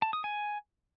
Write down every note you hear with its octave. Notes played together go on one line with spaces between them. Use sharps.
A5
D#6
G#5